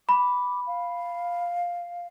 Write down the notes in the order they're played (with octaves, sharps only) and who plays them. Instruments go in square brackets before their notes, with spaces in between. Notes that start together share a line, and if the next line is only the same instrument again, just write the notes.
[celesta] B5 [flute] D6
[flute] F5